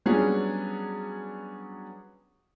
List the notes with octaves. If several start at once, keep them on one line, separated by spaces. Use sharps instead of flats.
F#3 G3 B3 C#4 D4 G#4